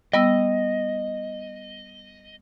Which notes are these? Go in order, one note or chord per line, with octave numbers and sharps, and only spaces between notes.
G3 B3 D#5 E6